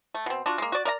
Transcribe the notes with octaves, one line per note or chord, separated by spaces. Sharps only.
A3
B2 C4
D4 F4 F#4
G#3 A#3
F#4 D5
A#4 D5 F5 A#5